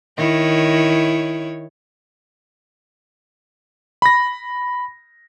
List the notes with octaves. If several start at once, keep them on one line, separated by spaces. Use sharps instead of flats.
D#3 E4 C#5
B5 A#6